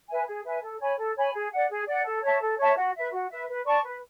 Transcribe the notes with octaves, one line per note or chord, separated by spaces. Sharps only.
B4 E5 G#5
G#4
B4 E5 G#5
A4
C#5 G#5 B5
A4
C#5 G#5 B5
G#4
D5 F#5
G#4
D5 F#5
A4
C#5 E5 A5
A4
C#5 E5 A5
F#4
B4 E5
F#4
B4 E5
B4
D5 A5 C#6
B4